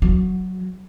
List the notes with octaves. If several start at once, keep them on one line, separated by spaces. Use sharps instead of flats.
F#3